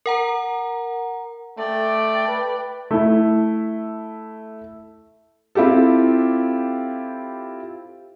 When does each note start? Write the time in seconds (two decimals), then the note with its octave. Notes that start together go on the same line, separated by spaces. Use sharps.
0.06 A#4 F#5 A#5
1.58 A3 D5 G5
2.28 B4
2.91 A3 E4
5.55 C4 E4 F4 G4 A4